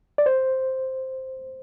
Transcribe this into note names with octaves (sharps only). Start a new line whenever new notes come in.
D5
C5